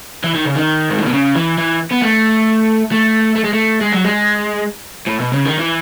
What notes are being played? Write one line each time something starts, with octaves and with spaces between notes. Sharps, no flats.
E3
D#3
C#3
D#3
G#2
A2
B2
C#3
E3
E3
B3
A3
A3
A3
G#3
A3
G#3
F#3
G#3
A2
B2
C#3
D#3
E3